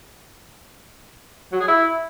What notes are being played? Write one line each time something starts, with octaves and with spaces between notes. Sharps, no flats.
F#3
G#4
E4